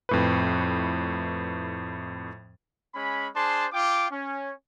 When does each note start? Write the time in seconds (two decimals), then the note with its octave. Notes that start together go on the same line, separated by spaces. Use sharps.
0.09 F2 A2 B4
2.94 G#3 C#4 B5
3.35 D4 G#4 C5 A5 C6
3.72 F4 G5 D6
4.10 C#4